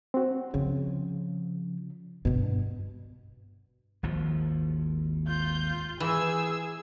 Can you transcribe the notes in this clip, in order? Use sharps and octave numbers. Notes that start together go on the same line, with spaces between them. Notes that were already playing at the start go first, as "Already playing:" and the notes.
C4 F#4
C#3 F3
G2 B2 B3
G#1 D#2 F3
F4 G6
E3 G#4 G#5 E6